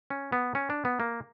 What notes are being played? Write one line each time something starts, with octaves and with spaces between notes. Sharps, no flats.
C#4
B3
C#4
D4
B3
A#3